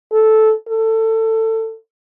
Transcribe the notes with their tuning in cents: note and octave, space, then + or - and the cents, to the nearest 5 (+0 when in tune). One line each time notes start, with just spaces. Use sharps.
A4 -10
A4 +20